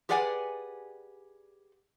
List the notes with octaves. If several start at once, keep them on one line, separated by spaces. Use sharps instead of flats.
G4 G#4 B4 D5 F#5 G#5